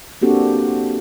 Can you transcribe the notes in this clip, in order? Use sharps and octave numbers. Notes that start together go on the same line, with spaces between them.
A#3 C4 D4 F#4 G4 A4